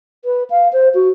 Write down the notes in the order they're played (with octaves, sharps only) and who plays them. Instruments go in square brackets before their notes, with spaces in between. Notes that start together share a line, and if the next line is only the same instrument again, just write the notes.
[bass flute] B4
F5
C5
F#4